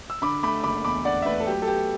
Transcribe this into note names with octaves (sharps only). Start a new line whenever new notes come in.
E6
D3 B5 D6
A3 B5 D6
F#1 B5 D6
E2 B5 D6
D3 D5 F#5
E5
A3 B4 D5
A4
F#3 G4
A4
B3 G4